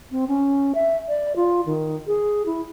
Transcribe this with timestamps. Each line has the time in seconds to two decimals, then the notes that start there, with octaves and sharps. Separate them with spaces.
0.11 C4
0.28 C#4
0.75 E5
1.08 D5
1.36 F4
1.66 D#3
2.07 G#4
2.46 E4